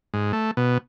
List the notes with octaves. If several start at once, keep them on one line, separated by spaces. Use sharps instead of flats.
G#2
A3
B2